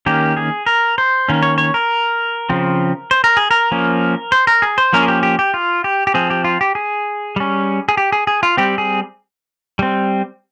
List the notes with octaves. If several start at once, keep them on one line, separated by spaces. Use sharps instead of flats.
D#3 A#3 C#4 G4
G#4
A#4
C5
D#3 A#3 C#4
C#5
C#5
A#4
C#3 F3 C4
C5
A#4
G#4
A#4
F3 A#3 C#4
C5
A#4
G#4
C5
F3 A#3 C#4 A#4
G#4
G4
G4
G4
F4
G4
G4
F3 C4 G#4
G4
F4
G4
G#4
G3 C#4
G#4
G4
G#4
G#4
F4
G3 C4 G4
G#4
G3 C4